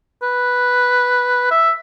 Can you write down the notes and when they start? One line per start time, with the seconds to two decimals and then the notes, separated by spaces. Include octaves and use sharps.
0.22 B4
1.51 E5